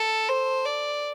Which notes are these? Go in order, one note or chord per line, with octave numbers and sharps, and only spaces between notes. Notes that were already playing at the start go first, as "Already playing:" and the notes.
Already playing: A4
C5
D5